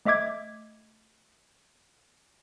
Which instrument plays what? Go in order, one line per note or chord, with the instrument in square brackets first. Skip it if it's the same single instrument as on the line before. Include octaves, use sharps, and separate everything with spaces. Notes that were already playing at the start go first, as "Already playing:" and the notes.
[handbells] A3 D#5 E5 D6 G#6